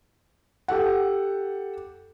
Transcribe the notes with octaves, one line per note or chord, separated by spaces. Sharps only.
G4 A4 F#5